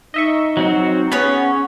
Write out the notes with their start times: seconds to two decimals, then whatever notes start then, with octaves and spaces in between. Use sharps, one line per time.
0.14 D#4 D#5 E5 C#6
0.57 F#3 C4 F#4
1.12 B3 C#4 G#4 C#5 F#5 B5